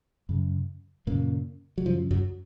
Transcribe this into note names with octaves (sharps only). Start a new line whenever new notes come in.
F#2 C#3
F#2 A#2 C#3 A#3
F#3
F#2 C#3 F3
F#2 F#3